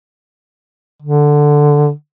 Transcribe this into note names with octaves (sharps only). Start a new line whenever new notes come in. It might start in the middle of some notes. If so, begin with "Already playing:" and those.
D3